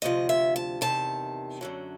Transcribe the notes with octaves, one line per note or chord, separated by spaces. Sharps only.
D2 C3 F3 D#5
E5
A5
E2 C3 D#3 A5
F#2 D3 F#3